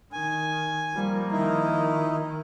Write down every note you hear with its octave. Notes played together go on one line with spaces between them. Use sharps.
D#3 G#5
F3 G3 A#3
D#3 D#4 E4